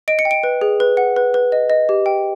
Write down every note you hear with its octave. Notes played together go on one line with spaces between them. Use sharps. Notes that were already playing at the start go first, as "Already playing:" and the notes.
D#5 D7
C#7
G5
D7
B4
G#4
B4
F#5
B4
B4
D#5
D#5
G4
G5